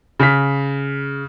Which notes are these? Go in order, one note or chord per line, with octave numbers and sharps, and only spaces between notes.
C#3 F6 B6